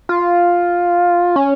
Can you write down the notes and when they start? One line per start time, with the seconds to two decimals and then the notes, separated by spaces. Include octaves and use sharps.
0.09 F4
1.36 C#4